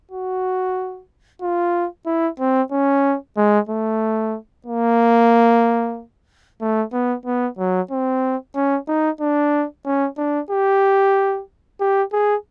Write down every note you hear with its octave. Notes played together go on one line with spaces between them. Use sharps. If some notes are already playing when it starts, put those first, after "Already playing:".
F#4
F4
E4
C4
C#4
G#3
A3
A#3
A3
B3
B3
F#3
C4
C#4
D#4
D4
C#4
D4
G4
G4
G#4